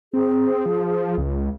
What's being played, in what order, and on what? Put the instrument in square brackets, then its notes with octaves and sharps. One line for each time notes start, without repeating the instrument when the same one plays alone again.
[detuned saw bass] C4 [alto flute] G#4
[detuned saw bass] F3
C#2